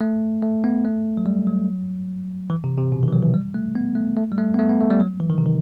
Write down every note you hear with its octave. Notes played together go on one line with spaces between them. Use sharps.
A3
A3
B3
A3
F#3
G3
F#3
E3
C3
C3
B2
D#3
E3
F#3
E3
G3
A3
B3
A3
A3
G3
A3
B3
A3
B3
A3
G3
F#3
E3
D#3
C3
D#3